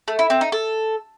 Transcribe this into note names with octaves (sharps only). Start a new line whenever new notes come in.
A3
E4
C4
D#4
A4